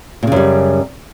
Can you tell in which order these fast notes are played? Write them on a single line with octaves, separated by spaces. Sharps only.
A#2 C#3 F#2 G3